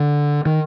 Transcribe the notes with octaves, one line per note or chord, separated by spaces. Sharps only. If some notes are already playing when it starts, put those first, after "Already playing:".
Already playing: D3
D#3